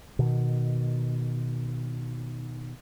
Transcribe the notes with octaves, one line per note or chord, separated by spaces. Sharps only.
B2 D#3